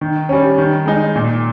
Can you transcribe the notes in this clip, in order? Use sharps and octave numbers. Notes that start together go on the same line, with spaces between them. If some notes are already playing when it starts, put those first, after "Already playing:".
D#3
G3 C#4
D#3
G#3 D#4
A#2